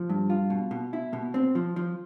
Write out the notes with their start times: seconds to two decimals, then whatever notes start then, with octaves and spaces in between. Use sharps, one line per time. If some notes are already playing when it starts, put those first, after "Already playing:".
Already playing: F3
0.10 G2
0.30 F4
0.50 B2
0.71 B2
0.93 E4
1.13 B2
1.34 C4
1.55 F3
1.76 F3